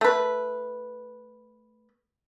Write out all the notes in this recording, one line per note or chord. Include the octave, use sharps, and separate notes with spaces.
A3 B4